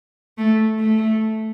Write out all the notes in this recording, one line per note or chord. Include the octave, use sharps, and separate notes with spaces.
A3
A3